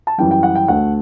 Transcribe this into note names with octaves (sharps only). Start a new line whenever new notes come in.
A5
F#2 E3 G3 G5
G5
F#5
G5
D2 D3 A3 F#5